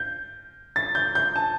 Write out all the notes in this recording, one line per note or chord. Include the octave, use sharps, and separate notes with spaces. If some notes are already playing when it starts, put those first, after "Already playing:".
Already playing: G6
A6
G6
G6
A5